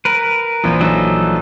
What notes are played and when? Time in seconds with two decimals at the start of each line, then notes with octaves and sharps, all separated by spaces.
0.05 A#4 B4
0.64 A#1 E3 F3
0.81 F#3 D#4 A4